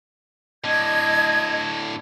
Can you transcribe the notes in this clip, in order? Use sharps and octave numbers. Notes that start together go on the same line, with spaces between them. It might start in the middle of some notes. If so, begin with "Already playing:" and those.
A2 D3 D#5 G#6